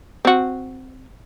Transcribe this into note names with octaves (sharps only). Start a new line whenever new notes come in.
C4 F#4